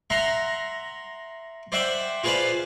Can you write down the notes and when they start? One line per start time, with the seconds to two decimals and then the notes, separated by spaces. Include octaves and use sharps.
0.10 E5 F#5 A#5 C6
1.72 C5 D5 E5 F#5 G5
2.24 F4 G#4 B4 C5 D5 F5